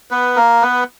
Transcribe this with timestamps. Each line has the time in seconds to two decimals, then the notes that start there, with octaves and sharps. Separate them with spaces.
0.11 B3 B4
0.36 A#3 A#4
0.62 B3 B4